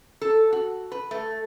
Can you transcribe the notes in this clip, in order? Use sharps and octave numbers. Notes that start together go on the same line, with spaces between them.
A4
F#4
B4
A3